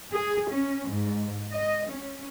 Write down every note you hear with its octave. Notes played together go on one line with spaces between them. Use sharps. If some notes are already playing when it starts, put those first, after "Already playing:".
G#4
C#4
G#2
D#5
C#4